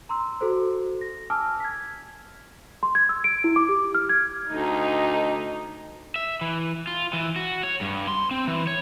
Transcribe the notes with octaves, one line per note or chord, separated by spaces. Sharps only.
A#5 C6 E6
F#4 A4 C5
A#6
G#5 A5 D6 E6 F6
G#6 B6
C6
G#6
E6
D7
E4
D6
G4
F6
G#6
D2 D#4
E5
E3
F4
E3
F#4
C#5
G2
C6
C4
E3
C#5